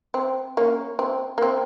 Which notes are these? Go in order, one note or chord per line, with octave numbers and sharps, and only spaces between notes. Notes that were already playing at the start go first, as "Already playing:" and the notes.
C4
A#3 C#4
C4
A#3
C4